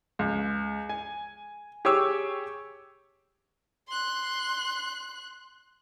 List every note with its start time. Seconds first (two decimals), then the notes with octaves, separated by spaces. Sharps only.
0.19 C#2
0.89 G#5
1.85 G4 G#4 C#5 C#6 D6 E6
3.88 C6 F#6